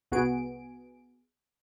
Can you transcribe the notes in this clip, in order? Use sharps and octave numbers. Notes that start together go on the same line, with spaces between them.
C2 B3 F#4 G#4 D7